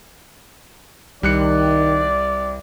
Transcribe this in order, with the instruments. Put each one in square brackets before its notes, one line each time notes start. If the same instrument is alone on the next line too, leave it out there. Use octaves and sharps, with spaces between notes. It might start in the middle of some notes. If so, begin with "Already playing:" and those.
[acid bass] C2 [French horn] D#3 [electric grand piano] G3 F#6 C#7 [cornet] D5